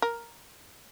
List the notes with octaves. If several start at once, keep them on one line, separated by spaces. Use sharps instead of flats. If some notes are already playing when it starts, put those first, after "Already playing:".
A#4